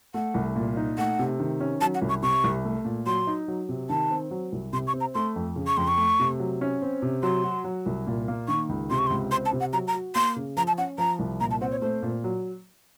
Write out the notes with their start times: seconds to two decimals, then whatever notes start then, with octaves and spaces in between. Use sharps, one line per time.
0.14 A3 F#5
0.34 C2
0.56 A#2
0.77 D#4
0.98 A3 F#5
1.19 C3
1.40 D#3
1.60 C#4
1.81 F#3 A5
1.95 F#5
2.02 C2
2.09 C#6
2.22 C3 C#6
2.44 C2
2.65 A3
2.85 A#2
3.06 F#3 C6
3.27 D#4
3.48 F#3
3.69 C3
3.89 D#3 A5
4.11 C4
4.31 F#3
4.52 C2
4.73 C3 C6
4.87 C#6
4.93 C4
5.00 A#5
5.14 A3 C6
5.36 F2
5.56 C#3
5.67 C#6
5.77 F2 C6
5.88 C#6
5.97 A3
6.19 C3
6.40 F#3
6.61 C#4
6.82 C4
7.02 C3
7.23 F#3 C6
7.44 F#4
7.64 F#3
7.86 C2
8.07 A#2
8.28 A#3
8.48 D#3 C#6
8.69 C#2
8.90 C3 C6
8.98 C#6
9.07 C6
9.10 C#2
9.31 C4 C6
9.46 A5
9.53 C3
9.60 F#5
9.73 F#3 A#5
9.87 A#5
9.94 F#4
10.15 A#3 C6
10.36 C#3
10.57 F3 A#5
10.67 A5
10.78 C#4 F#5
10.98 F3 A#5
11.19 C2
11.40 A#2 A#5
11.51 A5
11.61 C4 F#5
11.71 C#5
11.82 A3 C5
12.02 A#2
12.24 F#3